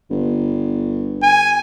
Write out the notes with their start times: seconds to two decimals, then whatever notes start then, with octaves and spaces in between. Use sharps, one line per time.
0.10 G1
1.22 G#5